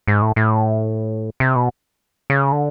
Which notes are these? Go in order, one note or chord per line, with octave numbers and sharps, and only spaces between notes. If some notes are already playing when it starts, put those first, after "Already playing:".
G#2
A2
A2
C3
B2
C#3
D3